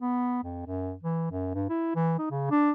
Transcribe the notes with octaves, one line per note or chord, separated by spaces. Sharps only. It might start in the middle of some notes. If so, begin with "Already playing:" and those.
B3
F2
F#2
E3
F#2
G2
E4
E3
D#4
C#3
D4